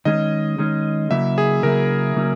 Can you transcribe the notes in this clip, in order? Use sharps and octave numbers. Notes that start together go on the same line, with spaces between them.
D#3 G#3 C#4 D#5
D#3 G#3 C#4
C#3 F#3 A#3 E4 E5
G#4
C#3 F#3 A#3 E4 A#4
C#3 F#3 A#3 C#4